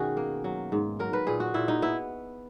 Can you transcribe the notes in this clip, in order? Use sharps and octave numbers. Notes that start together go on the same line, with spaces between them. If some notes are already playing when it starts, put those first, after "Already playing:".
Already playing: B2 D#3 C#4 F#4 G#4
A#3
F#3
G#2
F#3 A#4
B4
A#2 G#4
F#4
A#2 E4
D#4
B3 E4